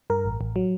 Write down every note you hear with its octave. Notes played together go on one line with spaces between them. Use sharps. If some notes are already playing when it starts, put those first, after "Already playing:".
G2 A#4
A1
A1
F#3